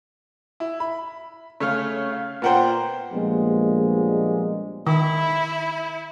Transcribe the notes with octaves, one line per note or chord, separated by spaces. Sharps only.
E4
B5
C#3 A3 C#5 F5
F5
A#2 B3 A#4 C5 F#5 G5
A#1 F3 G3 G#3 A#3 B3
D#3 E4